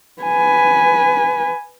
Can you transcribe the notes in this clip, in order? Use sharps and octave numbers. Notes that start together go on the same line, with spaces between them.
B4 G#5